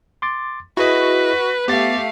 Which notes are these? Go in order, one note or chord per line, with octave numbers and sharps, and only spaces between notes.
C6 D6 A6
E4 F#4 G#4 B4 D#5
A3 B3 G4 F5 A6